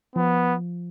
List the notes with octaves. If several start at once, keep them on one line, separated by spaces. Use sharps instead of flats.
F3 B3